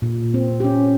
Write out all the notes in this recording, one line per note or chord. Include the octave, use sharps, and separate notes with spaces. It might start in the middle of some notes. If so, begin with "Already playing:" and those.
A#2
C4
C#4 G4